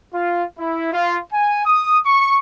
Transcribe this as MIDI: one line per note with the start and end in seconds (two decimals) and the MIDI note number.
0.14 0.44 65
0.59 0.92 64
0.92 1.17 65
1.32 1.62 80
1.65 1.98 87
2.06 2.38 85